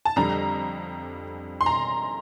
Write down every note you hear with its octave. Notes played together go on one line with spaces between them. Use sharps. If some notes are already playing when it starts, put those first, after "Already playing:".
A5
F2 D3 G3 A#5
C6
A#5